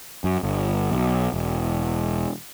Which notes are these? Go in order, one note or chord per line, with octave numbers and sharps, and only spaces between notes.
F#2
G1
B1
E1